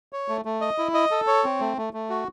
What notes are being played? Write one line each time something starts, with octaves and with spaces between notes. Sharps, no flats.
C#5
A3
A3
D#5
E4
D#5
A4
C#5
C4
A3
A3
A3
F#4